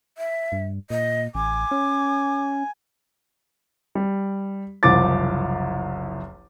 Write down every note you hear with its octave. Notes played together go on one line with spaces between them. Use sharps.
E5
G2
A#2 D#5
A1 G#5 D6
C#4
G3
F#1 C2 F3 D6 A6